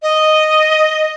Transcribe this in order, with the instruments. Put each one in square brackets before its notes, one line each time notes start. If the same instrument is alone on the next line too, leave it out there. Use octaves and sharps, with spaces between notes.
[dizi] D#5